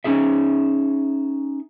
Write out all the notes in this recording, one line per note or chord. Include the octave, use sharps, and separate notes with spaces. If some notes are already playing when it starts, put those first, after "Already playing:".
C#4 D#4 G#4 E5